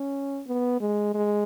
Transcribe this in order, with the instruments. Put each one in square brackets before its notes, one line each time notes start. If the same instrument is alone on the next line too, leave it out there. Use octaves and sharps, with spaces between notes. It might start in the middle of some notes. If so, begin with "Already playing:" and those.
Already playing: [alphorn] C#4
B3
G#3
G#3